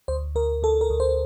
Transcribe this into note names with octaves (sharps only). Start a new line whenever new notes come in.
D2 C5
D2 A#4
D2 A4
A#4
D2
C5